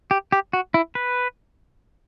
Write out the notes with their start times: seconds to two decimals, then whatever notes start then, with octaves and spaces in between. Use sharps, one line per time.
0.11 G4
0.32 G4
0.53 F#4
0.74 E4
0.95 B4